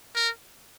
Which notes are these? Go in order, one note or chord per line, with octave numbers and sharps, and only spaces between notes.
A#4